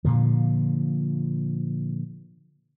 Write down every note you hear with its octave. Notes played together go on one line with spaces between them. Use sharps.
A#2 D3 F3